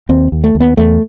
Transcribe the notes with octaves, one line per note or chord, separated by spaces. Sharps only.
D#2 C4
D#2
A3
D#2
B3
E2 A3